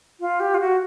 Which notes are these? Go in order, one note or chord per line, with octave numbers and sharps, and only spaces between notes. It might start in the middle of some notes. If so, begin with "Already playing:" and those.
F4
G4
F4
F#4